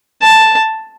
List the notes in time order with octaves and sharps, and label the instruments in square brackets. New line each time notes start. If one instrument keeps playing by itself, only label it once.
[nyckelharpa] A5